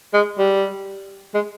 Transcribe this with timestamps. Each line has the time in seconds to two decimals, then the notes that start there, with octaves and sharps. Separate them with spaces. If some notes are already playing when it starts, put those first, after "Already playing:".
0.13 G#3
0.38 G3
1.34 G#3